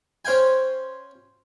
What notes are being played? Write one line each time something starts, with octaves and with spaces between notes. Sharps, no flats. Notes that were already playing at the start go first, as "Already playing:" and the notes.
C#4 C5 F5 G5 G#5